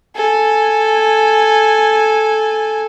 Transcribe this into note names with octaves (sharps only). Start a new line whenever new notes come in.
A4 G#5